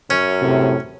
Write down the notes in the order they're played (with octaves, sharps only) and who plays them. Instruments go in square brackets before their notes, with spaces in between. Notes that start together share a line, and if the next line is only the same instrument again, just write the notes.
[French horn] F#2 [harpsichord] C#4
[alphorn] A2 [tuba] C3